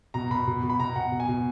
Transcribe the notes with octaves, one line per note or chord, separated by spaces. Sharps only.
B2 A#5
B2 B5
B2
B2
B5
B2 A#5
B2 F#5
B2
G#5
B2